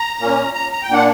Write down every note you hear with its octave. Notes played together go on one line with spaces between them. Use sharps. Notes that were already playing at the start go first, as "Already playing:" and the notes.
Already playing: A#5
A#2 A#3 C#4
A#5
A#5
G5
A#2 A#3 D4 F#5